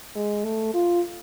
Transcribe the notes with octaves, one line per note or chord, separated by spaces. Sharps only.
G#3
A3
F4